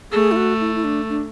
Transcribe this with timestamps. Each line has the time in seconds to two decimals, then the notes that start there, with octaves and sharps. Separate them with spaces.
0.12 A3 G#4
0.32 E4
0.36 F#4
0.61 E4
0.75 E4
0.84 D4
1.09 D4